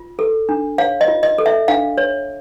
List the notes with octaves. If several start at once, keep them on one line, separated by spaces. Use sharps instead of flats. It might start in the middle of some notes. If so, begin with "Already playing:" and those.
Already playing: F4
A4
D4
C#5 F5
D#5
F4
D#5
A4
E5
D4 F5
C#5